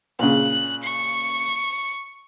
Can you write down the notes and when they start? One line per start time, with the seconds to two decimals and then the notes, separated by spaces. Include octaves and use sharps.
0.19 A#2 C#3 F#6
0.83 C#6